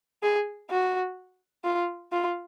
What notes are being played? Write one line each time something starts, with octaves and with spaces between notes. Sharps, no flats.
G#4
F#4
F4
F4